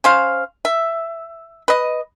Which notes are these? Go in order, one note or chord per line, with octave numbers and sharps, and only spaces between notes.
C#4 C5 F5
E5
B4 D#5